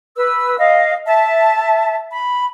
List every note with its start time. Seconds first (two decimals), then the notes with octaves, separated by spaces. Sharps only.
0.16 B4 E6
0.59 D#5 F5
1.06 E5 A5
2.11 B5